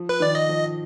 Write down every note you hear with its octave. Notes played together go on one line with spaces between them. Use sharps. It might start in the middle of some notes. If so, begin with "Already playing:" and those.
Already playing: F3
B4
D#3 D5
D#5
F3